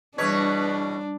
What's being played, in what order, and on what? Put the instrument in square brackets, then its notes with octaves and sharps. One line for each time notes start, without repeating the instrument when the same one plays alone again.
[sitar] E2 B2 C#5 [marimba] G3 G#6 [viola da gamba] D4 [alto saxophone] B4